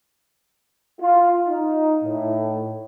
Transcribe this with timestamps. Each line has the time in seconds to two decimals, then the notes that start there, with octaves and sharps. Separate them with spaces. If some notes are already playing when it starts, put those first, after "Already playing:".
1.01 F4
1.49 D#4
2.04 A2